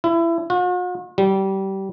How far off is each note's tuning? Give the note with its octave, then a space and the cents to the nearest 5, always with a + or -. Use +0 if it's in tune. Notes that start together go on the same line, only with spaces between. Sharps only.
E4 +25
F#4 -45
G3 -25